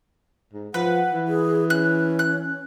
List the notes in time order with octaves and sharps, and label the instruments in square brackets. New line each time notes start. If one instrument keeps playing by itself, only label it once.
[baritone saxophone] G#2
[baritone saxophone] F3 [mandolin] B4 [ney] F#5
[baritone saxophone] E3
[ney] G#4
[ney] C#4 [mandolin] F#6
[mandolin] F#6